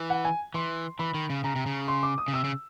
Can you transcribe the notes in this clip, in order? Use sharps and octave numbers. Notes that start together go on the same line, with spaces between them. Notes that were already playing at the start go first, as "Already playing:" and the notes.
Already playing: E3
F#5
G#5
E3 C6
E3 B5
D#3
C#3
C#3 A#5
C3
C#3
C6
D6
D#6
C#3
C3 E6
C#3